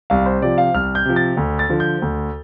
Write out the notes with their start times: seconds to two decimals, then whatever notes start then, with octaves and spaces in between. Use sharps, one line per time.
0.10 C2 F5
0.26 C5
0.42 C3 F3 D5
0.58 F5
0.74 C2 F6
0.95 G6
1.05 C3 F3
1.16 A6
1.37 D2
1.59 A6
1.69 D3 F3
1.80 G6
2.02 D2